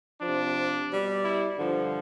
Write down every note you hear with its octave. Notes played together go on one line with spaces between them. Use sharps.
C3 F3 D4
B2 G3
E4
G2 D3 F3